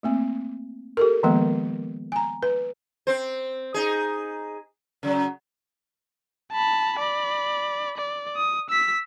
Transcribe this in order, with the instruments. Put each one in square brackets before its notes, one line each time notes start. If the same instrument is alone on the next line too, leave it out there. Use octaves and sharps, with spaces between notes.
[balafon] A3 A#3 C4
G4 A4 A#4
D#3 F3 G#3 A#3 B3
G#5 A#5
B4
[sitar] C4 C5
D#4 G#4
C#3 F#3
[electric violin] A5 B5
D5 B5
D5
D#6
E6 B6